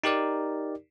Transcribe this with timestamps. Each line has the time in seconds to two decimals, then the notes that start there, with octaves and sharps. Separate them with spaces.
0.04 D#4 G4 A#4 D5